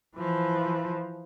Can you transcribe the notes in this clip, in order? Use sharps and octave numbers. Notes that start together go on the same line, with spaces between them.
E3 F3